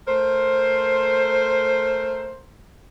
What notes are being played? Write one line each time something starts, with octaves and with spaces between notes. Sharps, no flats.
A3 A#4 C5